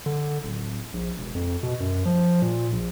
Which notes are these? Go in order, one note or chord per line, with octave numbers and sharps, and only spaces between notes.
D3
D1
A#1
E1
F2
B2
F#2
F3
A#2
A#1